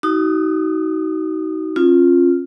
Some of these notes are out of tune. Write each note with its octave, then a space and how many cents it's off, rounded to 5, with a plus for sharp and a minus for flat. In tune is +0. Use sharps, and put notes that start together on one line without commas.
D#4 +25 F#4 +30 D#6 -25
C#4 -40 F4 +0